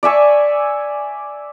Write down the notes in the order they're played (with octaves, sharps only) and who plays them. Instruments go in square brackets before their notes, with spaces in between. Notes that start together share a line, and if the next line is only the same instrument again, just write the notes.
[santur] D5 E5 G#5 C#6